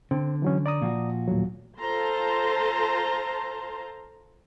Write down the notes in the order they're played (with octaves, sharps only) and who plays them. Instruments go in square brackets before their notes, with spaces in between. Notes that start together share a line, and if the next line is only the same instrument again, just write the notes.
[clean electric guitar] D3 [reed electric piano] C4
[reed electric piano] E3 F#3 C#4
D5 A#5 D#6
[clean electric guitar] A#2 F3 F#4
[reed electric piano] D#2 A2 F#3
[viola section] F4 A4 C5 A5 A#5 C6